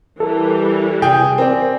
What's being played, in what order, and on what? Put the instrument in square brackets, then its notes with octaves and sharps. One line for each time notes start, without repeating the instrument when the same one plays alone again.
[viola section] E3 G3 [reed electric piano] A4 A#4
[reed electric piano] C3 [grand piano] G#4 G5
[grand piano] C4 [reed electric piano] A#4 D5